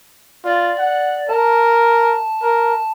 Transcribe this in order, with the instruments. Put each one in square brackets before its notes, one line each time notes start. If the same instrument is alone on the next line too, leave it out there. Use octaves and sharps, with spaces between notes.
[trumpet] F4 [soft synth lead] D5
[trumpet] F#5
[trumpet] A#4 [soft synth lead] A5
[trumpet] A#4